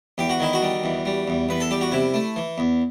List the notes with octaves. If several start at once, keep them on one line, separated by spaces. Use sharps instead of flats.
E2 G4
F#4
D#3 E4
F#4
G3
E2
G3
E2
E2 B4
A4
G3 G4
F#4
C3 E4
A3
E3
E2